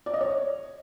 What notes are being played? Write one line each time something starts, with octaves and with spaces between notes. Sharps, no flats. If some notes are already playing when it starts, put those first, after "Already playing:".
D5
D#5
C#5